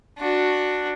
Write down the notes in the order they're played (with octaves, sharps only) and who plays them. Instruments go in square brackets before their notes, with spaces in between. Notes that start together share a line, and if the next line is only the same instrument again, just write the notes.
[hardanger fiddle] D4 F#4